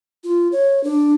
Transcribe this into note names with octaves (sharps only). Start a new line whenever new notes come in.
F4
C#5
D4